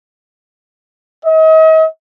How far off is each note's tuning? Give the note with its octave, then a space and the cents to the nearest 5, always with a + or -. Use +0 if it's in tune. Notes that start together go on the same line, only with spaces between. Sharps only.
D#5 +40